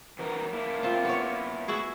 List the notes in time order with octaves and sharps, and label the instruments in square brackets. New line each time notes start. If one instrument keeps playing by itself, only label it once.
[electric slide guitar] E3 F#3 A#4
A#3 E4
[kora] C4 F4
B3 C#5
E4 F#4 G#4